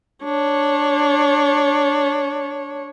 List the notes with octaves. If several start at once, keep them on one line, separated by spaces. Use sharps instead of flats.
D4 C#5